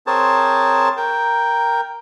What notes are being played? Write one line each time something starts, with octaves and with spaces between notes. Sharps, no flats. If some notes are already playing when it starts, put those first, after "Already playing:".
C4 G#4 A#4 C5 C#5 A5
A#4 G5